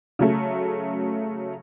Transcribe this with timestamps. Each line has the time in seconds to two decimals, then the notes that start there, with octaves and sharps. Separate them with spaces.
0.19 C#3 F#3 A3